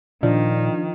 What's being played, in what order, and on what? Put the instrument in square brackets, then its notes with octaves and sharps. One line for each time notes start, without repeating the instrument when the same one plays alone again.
[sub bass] A#2 [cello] D#3 [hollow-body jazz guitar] F3 [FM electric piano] D4